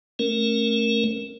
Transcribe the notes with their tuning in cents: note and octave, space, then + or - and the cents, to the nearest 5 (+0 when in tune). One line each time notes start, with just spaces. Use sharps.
A3 +0 C#4 -20 A#4 +0